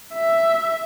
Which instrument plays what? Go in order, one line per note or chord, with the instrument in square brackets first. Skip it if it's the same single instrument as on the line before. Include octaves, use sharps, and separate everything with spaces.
[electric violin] E5